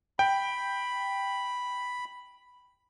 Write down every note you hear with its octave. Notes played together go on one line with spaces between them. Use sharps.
G5 B5